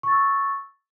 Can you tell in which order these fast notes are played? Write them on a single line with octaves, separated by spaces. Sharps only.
C#6 A6 E6